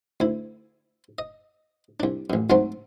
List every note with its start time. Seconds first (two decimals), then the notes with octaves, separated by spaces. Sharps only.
0.20 D2 E4
1.18 D#5
2.00 C2 D4
2.30 A1 F#2
2.50 C#2 G#2 F#3 G#3 A3 C4